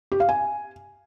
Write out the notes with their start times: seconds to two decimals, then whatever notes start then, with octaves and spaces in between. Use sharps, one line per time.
0.12 G4
0.20 F5
0.29 G#5